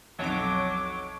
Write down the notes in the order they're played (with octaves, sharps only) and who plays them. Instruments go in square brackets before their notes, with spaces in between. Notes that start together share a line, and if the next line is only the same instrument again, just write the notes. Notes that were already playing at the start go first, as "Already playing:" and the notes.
[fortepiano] B1 F2 [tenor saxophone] F#3 [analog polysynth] C#5 D6